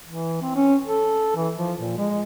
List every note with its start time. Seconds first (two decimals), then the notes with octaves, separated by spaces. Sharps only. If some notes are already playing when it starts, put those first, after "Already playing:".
0.07 E3
0.42 C4
0.55 C#4
0.87 A4
1.36 E3
1.56 F3
1.80 A#2
1.98 G#3